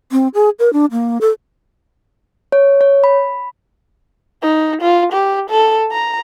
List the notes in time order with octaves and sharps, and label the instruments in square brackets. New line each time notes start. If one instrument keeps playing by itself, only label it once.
[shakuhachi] C4
G#4
A#4
D4
A#3
A4
[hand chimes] C#5
C#5
B5
[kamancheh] D#4
F4
G4
A4
A#5